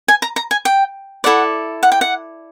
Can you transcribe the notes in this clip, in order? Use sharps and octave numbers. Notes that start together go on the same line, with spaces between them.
G#5
A#5
A#5
G#5
G5
E4 A4 D5 F#5
F#5
G5
F#5